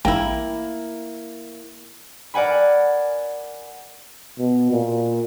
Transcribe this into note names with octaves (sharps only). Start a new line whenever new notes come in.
A1 A#3 E4 G5
A#4 D5 F#5 G#5 B5
B2
A#2